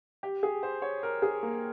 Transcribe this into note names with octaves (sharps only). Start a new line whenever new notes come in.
G4
G#4
C5
C#5
A#4
G#4
A#3